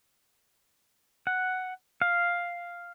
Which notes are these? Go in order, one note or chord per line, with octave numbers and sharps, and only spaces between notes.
F#5
F5